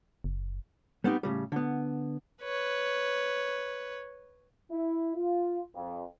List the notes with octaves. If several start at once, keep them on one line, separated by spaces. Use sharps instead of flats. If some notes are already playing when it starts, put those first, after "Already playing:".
F#1
G3 B3 C4 D#4 G4
A2 C#3 G3
D3 B3
B4 C#5
E4
F4
F2